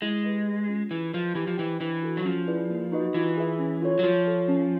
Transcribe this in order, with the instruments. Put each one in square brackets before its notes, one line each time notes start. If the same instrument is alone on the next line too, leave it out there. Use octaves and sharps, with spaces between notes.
[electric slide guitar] G#3 [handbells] E4
[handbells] G4 B4 D#5
A3
C#4 F4
[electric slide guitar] E3 [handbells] G#4
[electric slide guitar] F3 [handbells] B4 D#5
[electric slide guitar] E3 [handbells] G4
[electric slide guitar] F3
[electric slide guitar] E3 [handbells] C5 D#5 G5
[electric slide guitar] E3 [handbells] D4
[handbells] F#4 A4
[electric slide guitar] F#3
[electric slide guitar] F3 [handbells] C#4
[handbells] E4 G#4 B4 D5
A#3
D#4 F#4 B4 D#5
[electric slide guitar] E3 [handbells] F4
[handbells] G#4 B4 E5
C#4
F4 A4 C#5
[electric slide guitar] F#3
[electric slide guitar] F3 [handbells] F4
[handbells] A4 C#5
C#4